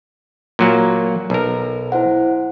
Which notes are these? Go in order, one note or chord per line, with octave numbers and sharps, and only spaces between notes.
A#2 F#3 A#3
B1 A#4
E4 C5 F#5